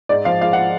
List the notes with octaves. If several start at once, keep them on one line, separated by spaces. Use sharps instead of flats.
G#2 D5
F3 F5
G#3 F5
F#5